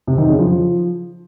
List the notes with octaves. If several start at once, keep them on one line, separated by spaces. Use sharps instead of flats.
C3
D#3
C#3
F3